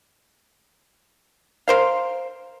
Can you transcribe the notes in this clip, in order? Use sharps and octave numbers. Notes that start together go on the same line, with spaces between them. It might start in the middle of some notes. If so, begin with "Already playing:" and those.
A#4 C5 F5